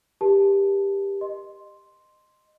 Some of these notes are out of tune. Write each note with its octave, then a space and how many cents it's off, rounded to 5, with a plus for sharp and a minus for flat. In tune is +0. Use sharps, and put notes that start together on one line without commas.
G4 +15 A#4 +45 A5 -10
D#5 -25 C6 +0